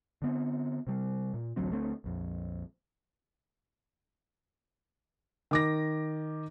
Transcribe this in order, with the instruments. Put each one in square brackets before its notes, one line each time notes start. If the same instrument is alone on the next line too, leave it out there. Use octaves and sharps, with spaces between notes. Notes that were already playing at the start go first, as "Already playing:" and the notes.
[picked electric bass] D3 B3 C4
C3 G3
A#2
A1 D2 F#3 C4
D2 A3 C4
A#1 F2
[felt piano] D#3 D6 A#6